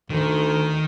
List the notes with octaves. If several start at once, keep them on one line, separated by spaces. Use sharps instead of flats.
D2 D#3